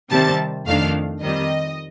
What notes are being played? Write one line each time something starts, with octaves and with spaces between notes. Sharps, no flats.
C3 D#3 G3 C4 A5
F2 D#3 A3 D4 F5
F2 D#3 G3 C4 D#5